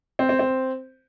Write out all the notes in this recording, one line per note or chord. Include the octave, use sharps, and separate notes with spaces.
C4
C4
C4